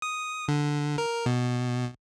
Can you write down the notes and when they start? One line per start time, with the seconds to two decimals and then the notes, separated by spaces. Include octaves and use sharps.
0.02 D#6
0.48 D3
0.98 A#4
1.26 B2